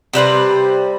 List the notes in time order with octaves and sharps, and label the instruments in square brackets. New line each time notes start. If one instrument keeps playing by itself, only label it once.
[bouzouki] C3 G3 B4 C5